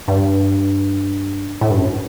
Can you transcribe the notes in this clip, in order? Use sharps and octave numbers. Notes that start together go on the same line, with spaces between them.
G2
A2
G2
F#2